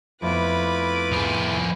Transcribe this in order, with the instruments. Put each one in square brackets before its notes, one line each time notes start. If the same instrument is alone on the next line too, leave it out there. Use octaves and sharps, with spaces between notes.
[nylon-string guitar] F2 B3 [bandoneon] A3 E4 F4 [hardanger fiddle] B4 D6
[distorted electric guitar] F3 G#4